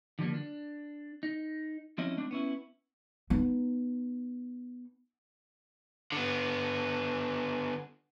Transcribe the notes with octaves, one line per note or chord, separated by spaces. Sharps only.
D3 F3 G3 A#3
D4
D#4
F3 C4 C#4 E4 D#5
A3 C4 D4
B3 C#4 E4
B3 D#4
D3 B3